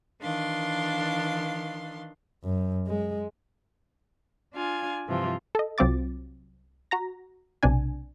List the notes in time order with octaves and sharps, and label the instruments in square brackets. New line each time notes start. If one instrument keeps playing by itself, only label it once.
[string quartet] D#3 E3 D4 F5 C6
[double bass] F#2
G#3
[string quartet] D4 F4 F5 G#5
G2 C3 E3 F3 F4
[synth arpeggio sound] A4 D#5
C2 F#3 C4 F4 D6 A6
F#4 A#5 A#6
B1 C3 D4 G#5